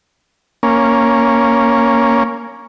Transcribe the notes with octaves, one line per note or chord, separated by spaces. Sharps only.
A#3 C#4